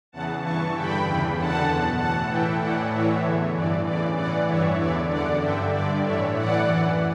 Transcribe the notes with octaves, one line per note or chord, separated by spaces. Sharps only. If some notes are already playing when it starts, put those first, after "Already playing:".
E2 C#3 E3 F#5 A5
G2 E3 A5 C#6
G2 D3 G5 B5
E2 C#3 E3
F#2 D3 F#5 A5
E2 B2
A2 E3 F#5 A5
A2 E3 E5 G5
A2 E3 D5 F#5
A2 E3 C#5 E5
E2 D3
G2 E3 D5
E2 C#3 E3 D5
A2 E3 D5 F#5
G2 E3 C#5 E5
E2 D3 D5
F#2 D3 D5 F#5
G2 D3 E5 G5
G2 D3 D5
A2 C#5 E5
E3
A2 E3 D5 F#5
F#2 E3